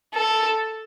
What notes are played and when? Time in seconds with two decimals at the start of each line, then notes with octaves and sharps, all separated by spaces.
0.15 A4